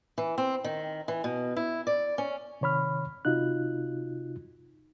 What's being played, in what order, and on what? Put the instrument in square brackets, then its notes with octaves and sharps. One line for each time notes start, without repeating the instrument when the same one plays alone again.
[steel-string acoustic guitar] E3
C4
D#3
E3
B2
E4
D5
C#4
[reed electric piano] C3 D#3 C#5 B5 F6
C3 D#4 F4 F#4 F#6